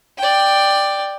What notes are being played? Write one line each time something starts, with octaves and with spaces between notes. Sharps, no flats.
D5 G5